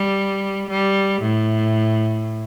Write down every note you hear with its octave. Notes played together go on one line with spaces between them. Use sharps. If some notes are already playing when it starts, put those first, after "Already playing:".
Already playing: G3
G3
A2